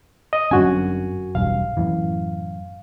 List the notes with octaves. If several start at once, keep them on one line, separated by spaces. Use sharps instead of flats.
D#5
G1 F#2 C4 D4 F#4 G#5
E1 B1 G2 F5
F#2 A2 E3